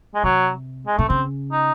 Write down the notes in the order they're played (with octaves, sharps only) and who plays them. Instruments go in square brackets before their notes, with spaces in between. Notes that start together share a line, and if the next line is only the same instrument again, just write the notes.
[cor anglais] G#3
[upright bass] C3 [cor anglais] F#3
[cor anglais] G#3
[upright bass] C3 [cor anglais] A3
[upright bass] C#3 [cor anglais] C4
[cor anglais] D#4